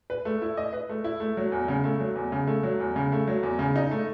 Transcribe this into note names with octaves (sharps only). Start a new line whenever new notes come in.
B4
A3
E4
D#5
B4
A3
E4
A3
F#3
E2
C#3
A3
F#3
E2
C#3
A3
F#3
E2
C#3
A3
F#3
E2
C#3
D#4
A3